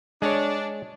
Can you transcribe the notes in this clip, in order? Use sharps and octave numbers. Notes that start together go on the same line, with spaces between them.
G#3 D4 C#5